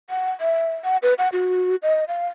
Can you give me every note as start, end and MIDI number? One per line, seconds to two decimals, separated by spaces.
0.10 0.31 78
0.40 0.74 76
0.84 0.97 78
1.03 1.14 71
1.18 1.29 78
1.32 1.76 66
1.83 2.04 75
2.08 2.27 77